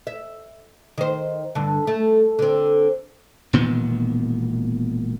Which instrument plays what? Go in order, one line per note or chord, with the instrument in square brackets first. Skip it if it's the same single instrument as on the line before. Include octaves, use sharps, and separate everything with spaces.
[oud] E5
D#3 C5
G2 D3
A3
D3 C4
[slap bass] E1 A#2 D#3 B3